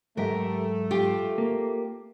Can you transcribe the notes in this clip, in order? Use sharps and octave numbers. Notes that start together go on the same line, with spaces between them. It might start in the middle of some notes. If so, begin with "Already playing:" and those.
G#2 F#3 A3 G4 A#4 E5
F4 G4 G5
A#3